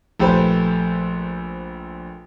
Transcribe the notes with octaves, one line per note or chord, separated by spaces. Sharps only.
A#1 A3 G4 B4 C5